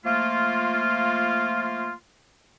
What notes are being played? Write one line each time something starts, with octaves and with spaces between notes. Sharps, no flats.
F3 A3 A#3 F4